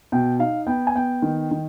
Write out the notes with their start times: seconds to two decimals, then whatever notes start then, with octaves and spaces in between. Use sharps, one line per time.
0.12 B2 G5
0.39 D#4 F5
0.67 B3 G5
0.87 G#5
0.95 B3 G5
1.22 D#3
1.51 D#3